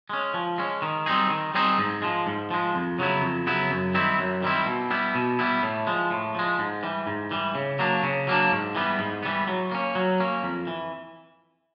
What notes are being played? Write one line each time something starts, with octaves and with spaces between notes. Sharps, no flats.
G#3 C#4
F3
G#3 C#4
D#3
G3 C4 D#4 G#4
D#3
G3 C4 D#4 G#4
G#2
F3 G#3
G#2
F3 G#3
F2
C#3 F#3 B3 E4
F2
C#3 F#3 B3 E4
F#2
D#3 G3 C4 E4
F#2
D#3 G3 C4 E4
B2
G3 B3 E4
B2
G3 B3 E4
A2
F3 G#3
A2
F3 G#3
G#2
E3 G3
G#2
E3 G3
C#3
F#3 A#3 D4
C#3
F#3 A#3 D4
G#2
E3 G3 B3
G#2
E3 G3 B3
F#3
A#3 C#4
F#3
A#3 C#4
F2
E3